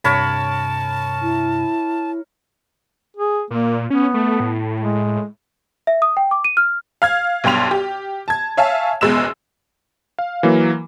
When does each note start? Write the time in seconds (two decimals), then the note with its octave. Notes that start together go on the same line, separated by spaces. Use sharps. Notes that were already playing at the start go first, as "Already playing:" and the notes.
0.04 G2 C3 A#4 C#5 A5 B5
1.22 E4
3.17 G#4
3.51 A#2 A#3
3.90 B3 C#4
4.14 A3
4.40 A2
4.81 G#3
5.87 E5
6.02 D#6
6.17 G5
6.31 D6
6.45 D#7
6.57 F6
7.02 F5 F6 G#6
7.44 B1 G2 G5 C6 F7
7.71 G4
8.28 A5 G#6
8.57 C#5 E5 F5 G#5 A5
9.01 F#1 E2 B2 G#3 E6 E7
10.19 F5
10.43 E3 F#3 A#3